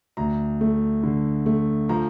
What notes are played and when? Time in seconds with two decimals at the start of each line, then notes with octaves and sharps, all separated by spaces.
0.17 D2 A#5
0.61 A3
1.03 D3
1.46 A3
1.89 F3 A#5